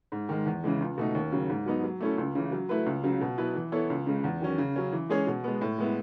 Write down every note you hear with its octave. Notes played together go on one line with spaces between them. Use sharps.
G#2
D#3 G#3
E2
C#3 E3 G#3
C#2
B2 A3 D#4
D#2
C#3 F#3
G#2
F#3 B3 D#4
F#3
A3 C#4 E4 A4
C#2
C#3 E3
F#3
A3 E4 B4
C#2
C#3 F#3
B2
F#3 B3 E4 B4
E3
B3 E4 A4 C#5
C#2
C#3 G#3
E2
D#3 F#3 C#4
C#3
F#3 C#4
E3
G#3 C#4 G#4 C#5
B2
G#3 B3
A2
G#3 B3 E4